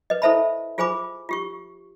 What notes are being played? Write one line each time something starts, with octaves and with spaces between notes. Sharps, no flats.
B4 D#5
E4 A4 C5 E5 A5 B5
F4 G#4 C5 G#5 B5 D6
F4 G4 C#6